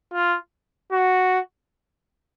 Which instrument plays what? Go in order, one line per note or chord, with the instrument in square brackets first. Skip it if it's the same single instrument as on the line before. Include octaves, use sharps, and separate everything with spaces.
[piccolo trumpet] F4
F#4